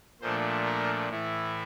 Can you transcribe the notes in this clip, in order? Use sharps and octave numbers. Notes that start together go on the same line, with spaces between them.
A#2 F3 A3 D4 C5
A#4
A2 E3 A3 E4